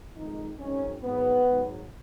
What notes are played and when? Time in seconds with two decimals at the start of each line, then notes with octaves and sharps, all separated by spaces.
0.15 F2 D#3 G#3 D#4
0.58 G#1 F#2 D#3 G#3 C#4
1.02 G#1 G#2 F#3 B3
1.46 G#1 G#2 F#3